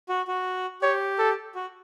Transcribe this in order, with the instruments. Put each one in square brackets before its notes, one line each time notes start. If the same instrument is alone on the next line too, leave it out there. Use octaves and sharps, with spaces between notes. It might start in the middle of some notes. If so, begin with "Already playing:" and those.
[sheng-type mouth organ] F#4
F#4
[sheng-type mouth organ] G4 [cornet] C#5
[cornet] A4
[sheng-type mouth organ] F#4